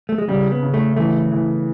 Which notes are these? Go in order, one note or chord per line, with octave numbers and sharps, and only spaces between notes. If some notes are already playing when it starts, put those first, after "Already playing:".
A3
G#3
C#3 G3
B3
C#3
A3
E3 A3
E3